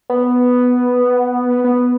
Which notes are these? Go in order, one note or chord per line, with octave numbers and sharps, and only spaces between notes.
B3
B3